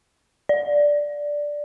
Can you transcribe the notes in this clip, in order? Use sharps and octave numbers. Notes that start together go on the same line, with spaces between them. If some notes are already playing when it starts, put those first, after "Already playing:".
D5